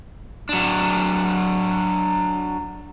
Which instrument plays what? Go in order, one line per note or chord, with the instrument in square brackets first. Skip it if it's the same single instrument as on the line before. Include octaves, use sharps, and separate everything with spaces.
[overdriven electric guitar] F#3 D4